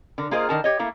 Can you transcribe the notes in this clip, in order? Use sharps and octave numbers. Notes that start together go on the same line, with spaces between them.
D3 A#4
A#3 F4 G#4 A#4 C5 D#5
D3 D#3 A#4 A5
G4 C#5 D#5
A3 A#3 E4 F5